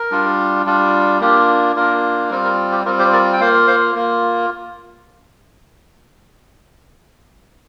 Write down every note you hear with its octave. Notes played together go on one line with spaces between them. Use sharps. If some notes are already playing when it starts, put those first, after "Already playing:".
Already playing: A#4
G3 D4 F4
G3 D4 F4
A#3 D4 F4 G4
A#3 D4 F4 A#4
G3 C4 F4 A#4
A#4
G4
G3 C4 F4 A#4
G4 C5
A#4 D5
G5
A#3 F4 C5 F5
C5 F5
A#3 F4